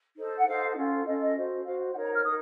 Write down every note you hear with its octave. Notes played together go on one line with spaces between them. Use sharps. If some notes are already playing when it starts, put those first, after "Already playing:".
D#4 A4 C5
F#5
D#4 A4 C5 F5
C#4 F4 A4
C#4 F4 A4 D#5
D#5
F#4 C5
F#4 C5 F5
D#4 A#4 C#5 F#5
A#5
F6
D#4 A#4 D#6